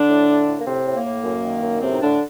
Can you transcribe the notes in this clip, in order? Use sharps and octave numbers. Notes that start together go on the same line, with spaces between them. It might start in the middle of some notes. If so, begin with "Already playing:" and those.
Already playing: D3 D4
A2
A2
A2
A#3
A2 C3 C4
A2
A#3
A2
F#2
D#3
F#2
A2 C3 C4
D#4
A2 D3 D4